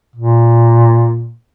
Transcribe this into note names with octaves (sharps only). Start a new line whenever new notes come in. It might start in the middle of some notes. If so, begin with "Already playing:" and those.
A#2